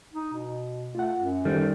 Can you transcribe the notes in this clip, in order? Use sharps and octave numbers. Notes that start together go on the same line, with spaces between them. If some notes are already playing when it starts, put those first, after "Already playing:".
D#4
B2
A3 F4 F#5
F#2
D#3 G3 A4 C5